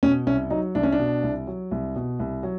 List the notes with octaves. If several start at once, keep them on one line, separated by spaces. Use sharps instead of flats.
B2 C#4
C2 C#4
F#3 D#4
C2 D4
C#4
D4
B2
C2
F#3
C2
B2
C2
F#3